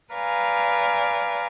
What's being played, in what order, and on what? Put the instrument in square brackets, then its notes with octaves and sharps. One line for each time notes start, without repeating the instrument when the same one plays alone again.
[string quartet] B4 D5 F5 G#5 A#5